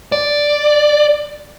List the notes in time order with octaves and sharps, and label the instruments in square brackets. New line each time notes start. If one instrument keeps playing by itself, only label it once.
[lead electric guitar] D5